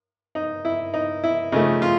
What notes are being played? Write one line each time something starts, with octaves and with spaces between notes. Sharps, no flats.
D#4
E4
D#4
E4
C#3 F3 A3 D#4
F4